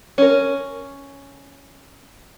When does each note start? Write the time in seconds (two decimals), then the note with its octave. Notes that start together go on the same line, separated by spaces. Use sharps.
0.18 C#4 A#4